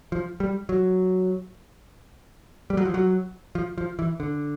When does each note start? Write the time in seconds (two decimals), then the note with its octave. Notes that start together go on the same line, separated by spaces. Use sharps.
0.12 F3
0.40 G3
0.69 F#3
2.70 G3
2.77 F#3
2.85 F3
2.94 F#3
3.55 F3
3.78 F3
3.99 E3
4.20 D3